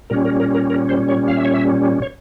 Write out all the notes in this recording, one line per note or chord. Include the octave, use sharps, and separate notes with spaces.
A#2 G3 C#4 A#4
A#4
A#4
A#4
A#4
C5
C#5
F5
E5
C#5
E5
C#5